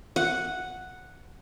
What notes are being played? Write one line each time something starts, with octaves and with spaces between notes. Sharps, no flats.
F#5